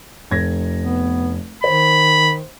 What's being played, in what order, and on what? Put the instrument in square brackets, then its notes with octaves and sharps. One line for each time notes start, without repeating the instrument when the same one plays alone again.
[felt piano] F1 G#6 A#6
[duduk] B3
[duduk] D#3 [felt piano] C5 [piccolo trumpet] B5